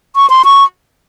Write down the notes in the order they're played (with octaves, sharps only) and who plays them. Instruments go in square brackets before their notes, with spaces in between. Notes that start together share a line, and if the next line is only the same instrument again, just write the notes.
[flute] C#6
C6
C#6